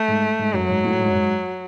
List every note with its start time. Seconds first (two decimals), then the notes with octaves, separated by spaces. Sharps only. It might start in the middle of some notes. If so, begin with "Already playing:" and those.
Already playing: A3
0.08 G#2
0.39 G#2
0.54 F#2 F#3
0.69 G#2
0.85 A2
1.00 G#2
1.08 F#2
1.15 G#2